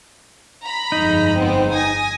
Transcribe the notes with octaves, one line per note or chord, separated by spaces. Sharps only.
A#5 B5
G1 F2 G#3 D#4
B3 C4
G#5 D#6 A#6